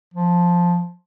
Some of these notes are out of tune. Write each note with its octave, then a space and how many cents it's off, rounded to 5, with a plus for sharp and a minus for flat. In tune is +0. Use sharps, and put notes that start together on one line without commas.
F3 +5